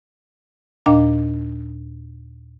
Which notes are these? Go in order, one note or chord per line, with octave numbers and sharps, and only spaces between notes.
D#2 A#2 D4 D#5 F5 A#5